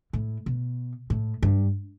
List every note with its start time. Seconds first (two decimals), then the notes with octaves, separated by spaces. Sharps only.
0.13 A2
0.46 B2
1.10 A2
1.42 G2